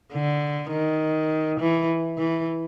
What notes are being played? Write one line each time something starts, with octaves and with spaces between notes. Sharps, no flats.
D3
D#3
E3
E3